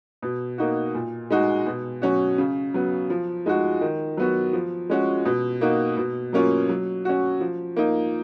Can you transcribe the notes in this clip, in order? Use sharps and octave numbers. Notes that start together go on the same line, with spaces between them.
B2
A#3 D#4 F#4
A#2
G#3 D#4 F#4
B2
F#3 C#4 F#4
C#3
F#3 B3
F3
G#3 D#4 F#4
D#3
F#3 B3 F#4
F3
G#3 C#4 F#4
B2
A#3 D#4 F#4
B2
F#3 A#3 C#4 F4
F#3
C#4 F#4
F3
A#3 D#4